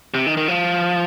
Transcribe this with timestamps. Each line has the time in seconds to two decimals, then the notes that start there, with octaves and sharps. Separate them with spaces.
0.14 C3
0.26 D#3
0.37 D#3
0.48 F3